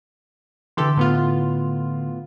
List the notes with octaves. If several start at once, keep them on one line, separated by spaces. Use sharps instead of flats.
D3 E3 G4 A4 C6
A2 B3 F4